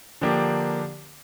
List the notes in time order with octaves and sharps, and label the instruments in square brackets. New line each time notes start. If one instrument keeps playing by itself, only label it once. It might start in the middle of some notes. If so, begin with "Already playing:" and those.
[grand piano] D3 F3 A#3 D4 G4